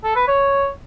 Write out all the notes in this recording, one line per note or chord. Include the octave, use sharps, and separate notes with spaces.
A4
B4
C#5